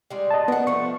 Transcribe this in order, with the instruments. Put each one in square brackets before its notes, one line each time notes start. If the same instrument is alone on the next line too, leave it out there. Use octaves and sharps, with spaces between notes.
[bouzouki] G3 G#3
[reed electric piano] D#5 A5
[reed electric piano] B3 [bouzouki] D4 F#4
[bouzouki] F3 A3 [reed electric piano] C#6